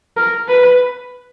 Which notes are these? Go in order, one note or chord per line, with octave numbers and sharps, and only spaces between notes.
A#4
B4